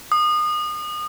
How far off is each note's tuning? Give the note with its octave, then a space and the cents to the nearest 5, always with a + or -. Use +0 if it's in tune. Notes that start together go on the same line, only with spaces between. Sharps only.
D#6 -30